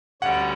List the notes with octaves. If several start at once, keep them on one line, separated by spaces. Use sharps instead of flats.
D2 D3 G3 C#4 F#5